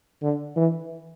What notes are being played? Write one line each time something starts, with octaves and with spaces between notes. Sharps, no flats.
D3
E3